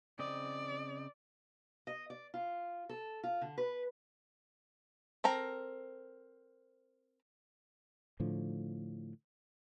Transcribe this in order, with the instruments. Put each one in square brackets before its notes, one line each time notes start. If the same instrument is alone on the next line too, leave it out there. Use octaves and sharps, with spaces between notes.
[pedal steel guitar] C#3 C4 D#5 [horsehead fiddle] D5
[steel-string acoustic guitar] D#5
D5
F4
A4
F4
D3
B4
[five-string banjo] C4 A4 A#4 A#5
[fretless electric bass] A2 D3 F3